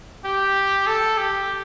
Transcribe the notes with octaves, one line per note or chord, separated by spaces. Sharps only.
G4
A4
G4